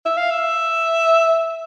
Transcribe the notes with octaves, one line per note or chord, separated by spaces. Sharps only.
E5
F5
E5